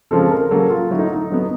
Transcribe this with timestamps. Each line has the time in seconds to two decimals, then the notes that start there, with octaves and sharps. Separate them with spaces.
0.11 C#3 F3 G#3 C4 A4
0.31 A#4
0.51 C#3 F#3 A#3 A4
0.70 F4
0.90 D3 F#3 A3 E4
0.99 D#4
1.14 D#4
1.30 D3 F#3 B3